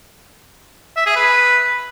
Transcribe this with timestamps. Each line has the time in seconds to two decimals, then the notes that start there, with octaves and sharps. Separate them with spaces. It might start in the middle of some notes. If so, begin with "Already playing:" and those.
0.97 E5
1.06 G#4
1.16 B4